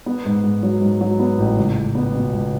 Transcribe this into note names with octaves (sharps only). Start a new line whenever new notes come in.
B3
G#2
G#2
F#3
G#2
F#3
B3
A1
C#2
C#2
B3
B2
C#2